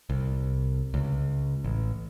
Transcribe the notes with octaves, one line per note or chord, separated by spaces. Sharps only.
C2
C#2
A1